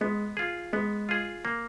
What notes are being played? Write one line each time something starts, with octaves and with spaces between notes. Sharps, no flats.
G#3 B3
F4 G#4
G#3 B3
F4 G#4
A#3